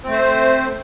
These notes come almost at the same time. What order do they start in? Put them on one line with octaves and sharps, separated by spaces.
C4 A3 C5